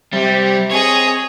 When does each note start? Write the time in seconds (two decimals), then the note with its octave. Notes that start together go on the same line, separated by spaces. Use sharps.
0.13 C3 G3
0.71 C4 G#4 C#5 D#5